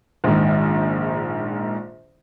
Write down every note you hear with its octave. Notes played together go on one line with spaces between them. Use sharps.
A#1 G#2 D#3